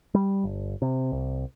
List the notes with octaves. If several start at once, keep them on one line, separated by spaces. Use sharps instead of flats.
G3
G1
C3
C2